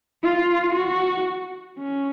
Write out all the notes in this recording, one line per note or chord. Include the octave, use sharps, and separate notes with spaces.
F4
F#4
C#4